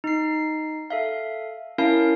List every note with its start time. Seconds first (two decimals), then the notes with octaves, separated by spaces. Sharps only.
0.04 D#4 C7
0.90 A4 E5 F5
1.78 C#4 E4 A#4 F5 A5